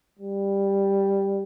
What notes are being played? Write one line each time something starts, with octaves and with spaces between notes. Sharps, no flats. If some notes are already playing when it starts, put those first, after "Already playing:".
G3